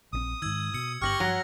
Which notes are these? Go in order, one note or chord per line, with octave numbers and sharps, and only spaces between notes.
A#1 C#3 C4 D#6
G#2 D#3 E6 G#6
B2 E6 C#7
G1 C3 B3 G4 C#6 F6 A#6 F#7
G2 F3 F#3 F#5 A#5